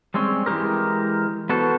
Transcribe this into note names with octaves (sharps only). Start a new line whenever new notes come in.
G3 G#3 C4 C#4
E3 G#3 F4 G4 A#4
B3 F#4 A4 B4 C5